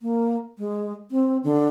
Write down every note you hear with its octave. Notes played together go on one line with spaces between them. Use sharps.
A#3
G#3
C4
D3